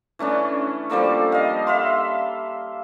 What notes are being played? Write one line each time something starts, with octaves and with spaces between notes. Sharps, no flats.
E3 A3 C#4 D4
F3 G3 A#3 A4
D#5 F5
E5 F5 C6